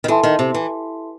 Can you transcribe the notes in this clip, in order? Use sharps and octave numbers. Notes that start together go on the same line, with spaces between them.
D#3
E3 E4 A4 E5 A5 C6
D#3
C3
E3